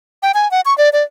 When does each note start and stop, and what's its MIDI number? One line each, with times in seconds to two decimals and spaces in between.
0.23 0.32 79
0.34 0.50 80
0.51 0.61 78
0.65 0.76 85
0.78 0.89 74
0.93 1.03 74